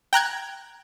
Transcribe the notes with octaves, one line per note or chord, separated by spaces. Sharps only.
G5 A#5 F#6 G#6